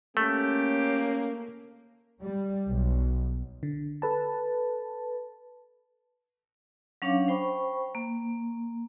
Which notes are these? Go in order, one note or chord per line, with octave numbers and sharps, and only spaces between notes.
A3 A#3 C#4 G4
G3
B1
D3
A4 B4 A5
F#3 C#4 D4 C#5 F5 D6
C5 G5 B5 C#6
A#3